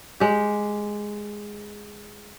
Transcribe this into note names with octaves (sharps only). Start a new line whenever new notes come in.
G#3 G4